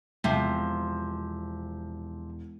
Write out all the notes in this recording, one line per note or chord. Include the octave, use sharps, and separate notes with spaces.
E1 C3 F3